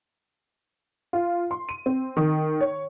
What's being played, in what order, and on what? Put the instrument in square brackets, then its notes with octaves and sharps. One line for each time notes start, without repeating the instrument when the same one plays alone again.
[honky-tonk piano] F4
C6
D#7
C4
D#3
C#5